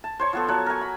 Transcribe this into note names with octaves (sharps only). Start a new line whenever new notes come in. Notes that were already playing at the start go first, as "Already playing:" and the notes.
A5
C5 C#5 C#6
F3 B3 A4
F#3 C#5 F#5
A#4 G#5
B5